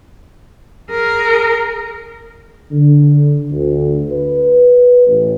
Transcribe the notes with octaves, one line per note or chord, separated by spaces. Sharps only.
G#4 A#4
D3
D2
B4
A1